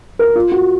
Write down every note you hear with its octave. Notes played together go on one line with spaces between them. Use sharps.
A#4
F4
F#4